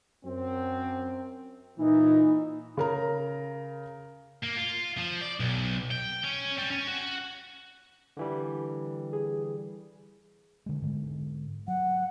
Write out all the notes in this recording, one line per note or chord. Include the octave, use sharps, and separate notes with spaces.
F#2 C4
A#2 E3 D#4
C#3 A#4 A#5
A#3
F4
F3
D5
B1
G5
C#4
G3
C#4
F#4
D3 E3 G3
G#4
D3 G#3
G#2 D3 G#3
F#3 F#5